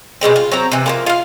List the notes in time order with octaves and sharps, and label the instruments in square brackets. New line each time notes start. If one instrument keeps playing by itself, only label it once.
[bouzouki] B2 G3 G#3 C4
F4
F#3 C4 A#5
C3 E3
F3 G#3 A#3
F4 F5